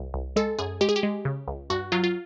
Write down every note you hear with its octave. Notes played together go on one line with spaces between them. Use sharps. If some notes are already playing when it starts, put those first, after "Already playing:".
Already playing: C2
C2
G#3 A4
F#2 G#4
G#3 G4
G#4
G4
G#3
C#3
C#2
G2 F#4
F#3 F4
F4